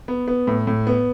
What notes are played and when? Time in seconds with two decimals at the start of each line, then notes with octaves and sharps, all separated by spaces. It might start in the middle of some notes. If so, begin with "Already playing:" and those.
0.08 B3
0.28 B3
0.47 A2
0.67 A2
0.87 B3